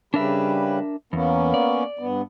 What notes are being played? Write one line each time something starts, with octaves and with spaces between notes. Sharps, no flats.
C#3 G3 D4 A#4 B4 E5
E2 A#3 B3 C#4
D5
G2 B3